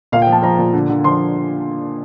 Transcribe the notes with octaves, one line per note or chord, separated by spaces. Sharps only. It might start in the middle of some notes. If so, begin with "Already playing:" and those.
A#2 F5
G5
F3
A5
F3 A#5
A#2
D3
D3
F3 C6